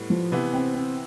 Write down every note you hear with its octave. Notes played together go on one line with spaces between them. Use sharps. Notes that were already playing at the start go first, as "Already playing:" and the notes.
Already playing: A2 G3 B3
F3
C3 E3 B3
C4
C4